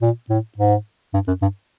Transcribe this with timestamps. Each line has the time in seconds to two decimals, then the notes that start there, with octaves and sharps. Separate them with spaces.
0.02 A#2
0.30 A2
0.58 G#2
1.14 G2
1.28 F#2
1.42 G2